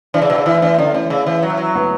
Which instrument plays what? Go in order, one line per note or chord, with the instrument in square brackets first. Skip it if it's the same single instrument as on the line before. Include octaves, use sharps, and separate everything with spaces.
[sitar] E3 [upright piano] D4
[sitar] C#3
B2
C#3
[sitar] E3 [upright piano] E4
[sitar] E3 [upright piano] D4
[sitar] D3 [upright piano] C#4
[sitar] E3 [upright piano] C#4
[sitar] C#3
E3
F#3
E3
F#3
[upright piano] B3